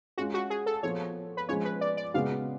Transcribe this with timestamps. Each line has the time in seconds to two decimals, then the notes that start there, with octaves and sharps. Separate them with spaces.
0.18 G#3 C#4 F4 F#4
0.34 F#4
0.50 G#4
0.66 A4
0.83 F3 B3 F4 A4 C#5
1.37 B4
1.49 F3 G#3 C#4 C#5
1.65 B4
1.81 D5
1.97 D5
2.14 C#3 G#3 B3 F#4 F5